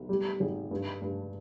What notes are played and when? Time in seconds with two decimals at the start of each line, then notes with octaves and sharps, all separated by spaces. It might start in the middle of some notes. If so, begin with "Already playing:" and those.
Already playing: B1
0.09 G3
0.40 G#1
0.71 G2
1.02 G2